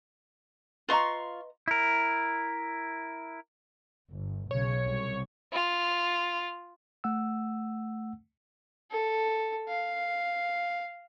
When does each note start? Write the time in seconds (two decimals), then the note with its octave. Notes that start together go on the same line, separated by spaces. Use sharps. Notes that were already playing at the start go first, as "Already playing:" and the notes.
0.89 F4 B4 D#5 A#5 C6 C#6
1.68 E4 A#4
4.12 G1
4.51 B1 C#3 C#5
4.86 C2
5.53 F4
7.04 A3 F#5 E6
8.91 A4
9.68 F5